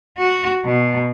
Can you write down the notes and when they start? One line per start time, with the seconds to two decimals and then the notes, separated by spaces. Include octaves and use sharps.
0.18 F#4
0.65 B2